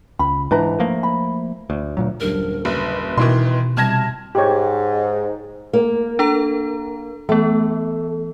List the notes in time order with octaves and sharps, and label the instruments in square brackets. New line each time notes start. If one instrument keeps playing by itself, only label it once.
[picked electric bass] C#2 [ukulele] B5
[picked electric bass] G#2 E3 [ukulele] D4 B4 A#5
[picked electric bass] F3 A3 A#3
[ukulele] B5
[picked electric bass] D2
D2 A#2 F#3
[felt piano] D#1 F#2 D3 [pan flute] A#4
[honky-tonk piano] F#1 [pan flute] B4
[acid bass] B2 [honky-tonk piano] D#3 E3 C6
[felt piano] C3 G3 [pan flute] A5 [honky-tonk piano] F6 G#6 A#6
[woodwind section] G#2 [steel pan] G4 C#5
[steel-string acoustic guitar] A#3
[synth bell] D4 A4 A#5
[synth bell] E3 B3 [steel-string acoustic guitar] A3